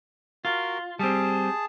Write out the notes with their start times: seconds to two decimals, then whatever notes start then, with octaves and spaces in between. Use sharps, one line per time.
0.45 F4 F#4 A#4
0.99 G3 C4 G#4 A5